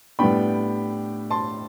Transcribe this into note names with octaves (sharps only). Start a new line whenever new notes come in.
A2 G3 B3 D4 G5 B5
A5 C6